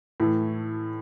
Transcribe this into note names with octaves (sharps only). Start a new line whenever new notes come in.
A2 E3 A3